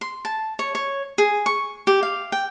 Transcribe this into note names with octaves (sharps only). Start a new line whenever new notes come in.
C6
A5
C#5
C#5
G#4
C#6
G4
F5
G5